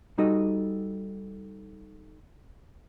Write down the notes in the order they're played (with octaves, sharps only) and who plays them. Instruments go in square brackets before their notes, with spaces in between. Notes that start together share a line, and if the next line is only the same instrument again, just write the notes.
[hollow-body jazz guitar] G3 D#4 F#4 A4 D#5